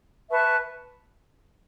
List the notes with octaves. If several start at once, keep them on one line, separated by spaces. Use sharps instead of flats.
B4 E5 A5 C#6